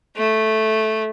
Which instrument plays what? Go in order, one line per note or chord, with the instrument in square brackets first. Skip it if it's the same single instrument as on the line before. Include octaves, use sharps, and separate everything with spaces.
[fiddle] A3